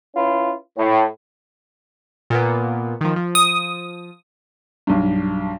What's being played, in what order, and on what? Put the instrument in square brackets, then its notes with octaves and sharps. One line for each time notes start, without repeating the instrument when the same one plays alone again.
[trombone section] C#4 E4 F4 B4
A2
[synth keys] A#2 A#3 B3
D#3 F3
F3
[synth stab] D#6
[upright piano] B1 G2